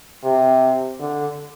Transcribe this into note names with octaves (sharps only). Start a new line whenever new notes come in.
C3
D3